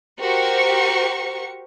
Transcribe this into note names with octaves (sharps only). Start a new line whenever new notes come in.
F#4 G4 A#4 C5 C#6 C#7